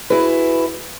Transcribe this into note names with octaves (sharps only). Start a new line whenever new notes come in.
E4 F#4 G#4 B4